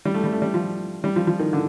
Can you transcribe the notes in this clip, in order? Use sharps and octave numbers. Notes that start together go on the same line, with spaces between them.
G3
A3
G3
A3
G3
F3
G3
F3
F3
D#3
D3